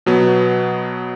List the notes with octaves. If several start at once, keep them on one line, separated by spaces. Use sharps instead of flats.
B2 F#3 B3